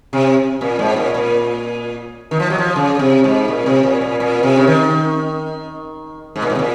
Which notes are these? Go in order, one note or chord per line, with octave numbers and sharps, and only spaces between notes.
C3
A#2
G#2
A#2
A#2
D#3
F3
F#3
F3
C#3
C3
G#2
A#2
C3
A#2
A#2
A#2
C3
C#3
D#3
G#2
A#2
G#2
C3
A#2